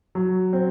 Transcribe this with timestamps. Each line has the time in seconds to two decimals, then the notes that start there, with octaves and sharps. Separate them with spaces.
0.15 F#3
0.53 C4